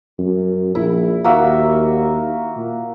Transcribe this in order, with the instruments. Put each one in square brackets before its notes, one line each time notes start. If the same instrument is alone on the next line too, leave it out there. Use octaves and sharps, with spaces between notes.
[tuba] F#2
[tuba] A#1 [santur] E4
[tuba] D#2 [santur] A#3 F#4 E5
[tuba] A#2